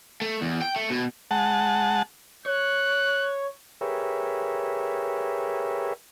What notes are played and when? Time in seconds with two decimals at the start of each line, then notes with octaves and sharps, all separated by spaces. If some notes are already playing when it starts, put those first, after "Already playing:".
0.22 A3
0.41 E2
0.62 G5
0.76 A3
0.90 B2
1.31 G#3 F#5 A5
2.46 C#5 F#6
3.81 G4 G#4 A#4 B4 C#5 E5